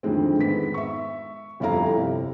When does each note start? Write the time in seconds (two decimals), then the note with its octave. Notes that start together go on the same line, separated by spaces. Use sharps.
0.03 F2 D3 D#3 G#3 C4
0.38 G#2 D#3 B3 B6
0.74 E5 C#6
1.60 G1 F2 E4 A4 F5 A#5
1.97 C3